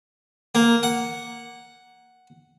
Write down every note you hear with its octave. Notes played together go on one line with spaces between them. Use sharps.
A#3
F#5